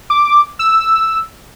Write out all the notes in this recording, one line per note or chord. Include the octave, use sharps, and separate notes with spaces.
D6
E6